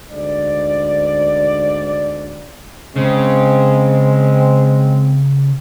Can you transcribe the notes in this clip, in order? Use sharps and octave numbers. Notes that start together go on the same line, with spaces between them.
D2 G#2 D5
C#3 G#3 C4